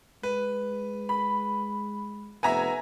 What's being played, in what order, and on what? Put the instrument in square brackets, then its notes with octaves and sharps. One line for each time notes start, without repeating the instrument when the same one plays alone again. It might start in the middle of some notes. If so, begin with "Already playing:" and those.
[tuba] G#3 [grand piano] B4
[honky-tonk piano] B5
[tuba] F1 [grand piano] B3 E5 [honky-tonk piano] G#5 A#5